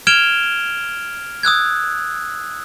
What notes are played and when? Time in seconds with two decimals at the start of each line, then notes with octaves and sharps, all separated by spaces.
0.07 F6 G#6 D7 E7 F7 G7
1.43 D#6 E6 F#6 G#6